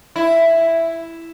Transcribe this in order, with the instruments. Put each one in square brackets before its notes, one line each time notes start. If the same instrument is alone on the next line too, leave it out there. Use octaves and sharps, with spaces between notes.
[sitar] E4